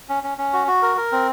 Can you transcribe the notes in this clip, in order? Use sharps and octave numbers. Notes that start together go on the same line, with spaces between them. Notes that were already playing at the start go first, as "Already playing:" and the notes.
C#4
C#4
C#4
F#4
F#4
A#4
A#4
C4